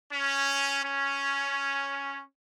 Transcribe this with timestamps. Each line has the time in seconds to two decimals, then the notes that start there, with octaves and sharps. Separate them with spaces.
0.12 C#4
0.83 C#4